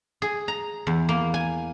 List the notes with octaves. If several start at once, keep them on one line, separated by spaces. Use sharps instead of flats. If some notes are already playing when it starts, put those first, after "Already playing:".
G#4
A#5
E2
A#3
G#5